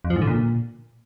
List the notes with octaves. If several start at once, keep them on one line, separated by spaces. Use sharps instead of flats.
F2
F3
G#2
D3
A#2